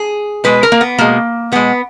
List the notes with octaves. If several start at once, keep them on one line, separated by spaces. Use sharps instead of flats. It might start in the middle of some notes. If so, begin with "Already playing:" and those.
Already playing: G#4
B2 G#3 B4
A#4
A#3
B3
B2 G#3 A#3
B2 G#3 B3